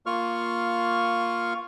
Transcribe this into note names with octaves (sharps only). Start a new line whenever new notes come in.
A#3 F4 C#6 F6